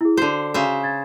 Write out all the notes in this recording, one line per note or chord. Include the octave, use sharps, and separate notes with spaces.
E4 G#4
D3 F#4 C5
C#3 F#4 C5 E5
G#6 A6